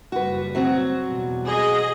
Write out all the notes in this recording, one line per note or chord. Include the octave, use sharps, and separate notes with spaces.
F#1 G3 F#4 B4
F#3 C4 F#4
E2 B2 G3
G#4 D#5